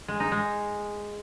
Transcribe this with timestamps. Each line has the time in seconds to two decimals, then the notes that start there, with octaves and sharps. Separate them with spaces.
0.08 G#3
0.20 D#4
0.32 G#3